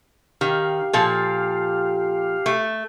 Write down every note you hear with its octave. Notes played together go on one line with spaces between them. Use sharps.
D#3 G4 F5
A#2 F3 A4
A3